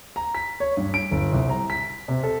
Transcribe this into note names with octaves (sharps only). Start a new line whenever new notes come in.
A#5
B6
C#5
G2
D7
G1
C2
A#5
B6
C3
A4